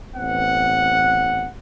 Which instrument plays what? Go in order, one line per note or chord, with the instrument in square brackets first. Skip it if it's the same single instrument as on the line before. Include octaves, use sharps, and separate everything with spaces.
[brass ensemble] A1 B3 C4 F#5